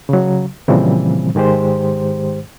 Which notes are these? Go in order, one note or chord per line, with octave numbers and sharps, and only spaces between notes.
C#3 F#3
A#2 C#3 E3 F3 G3 C4
G#2 D#3 G#3 G4 C5